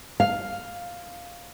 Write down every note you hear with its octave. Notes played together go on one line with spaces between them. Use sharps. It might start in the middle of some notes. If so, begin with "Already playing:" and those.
F5